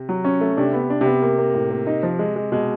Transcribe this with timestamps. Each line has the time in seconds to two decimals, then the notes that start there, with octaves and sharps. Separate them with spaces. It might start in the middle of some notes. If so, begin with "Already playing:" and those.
Already playing: C3
0.09 F#3
0.24 C#4
0.41 A3
0.57 C3 D4
0.73 B3
0.90 D4
1.01 C3 B3
1.22 A#3
1.38 A#3
1.55 A2
1.71 A#3
1.87 D#4
2.03 F3
2.19 G#3
2.36 G#3
2.52 B2 G#3